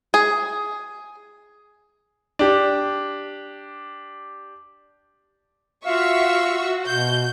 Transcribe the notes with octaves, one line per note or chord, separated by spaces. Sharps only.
G#4
D4 G4
F4 F#4 E5 F5 C#6 E6
B2 G6